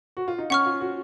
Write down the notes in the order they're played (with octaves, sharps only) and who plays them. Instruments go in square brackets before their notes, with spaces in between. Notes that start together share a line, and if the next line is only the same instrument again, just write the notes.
[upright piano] F#4
F4
D#4
[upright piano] C#4 [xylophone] F#5 C#6 F6
[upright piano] F4
F#4